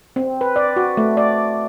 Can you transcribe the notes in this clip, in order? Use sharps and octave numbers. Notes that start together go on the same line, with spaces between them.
C4
B4
D5
F#4
A3
D5